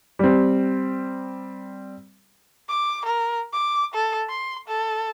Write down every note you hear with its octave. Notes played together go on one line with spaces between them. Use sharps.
G3 C4
D6
A#4
D6
A4
C6
A4